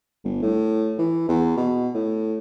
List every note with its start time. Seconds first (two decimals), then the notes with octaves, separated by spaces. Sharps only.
0.24 G1
0.42 A2
0.98 E3
1.29 E2
1.57 B2
1.94 A2